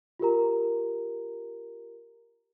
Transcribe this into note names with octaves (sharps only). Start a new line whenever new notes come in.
F4 G4 A#4 A#5